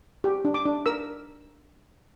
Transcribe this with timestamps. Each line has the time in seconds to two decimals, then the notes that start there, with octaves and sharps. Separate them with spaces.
0.24 G4
0.45 D4
0.54 D6
0.65 D4
0.86 A#4 E6